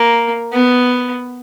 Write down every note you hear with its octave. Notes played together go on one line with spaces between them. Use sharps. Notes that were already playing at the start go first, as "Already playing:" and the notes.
Already playing: A#3
B3